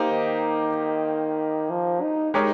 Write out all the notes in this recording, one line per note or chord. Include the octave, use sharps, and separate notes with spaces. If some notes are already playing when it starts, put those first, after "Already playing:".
Already playing: A#3 D#4 G4 C5
D#3
F3
D#4
G#3 D#4 G4 A#4 C#5